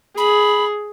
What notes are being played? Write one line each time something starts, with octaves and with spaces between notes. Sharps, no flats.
G#4 B5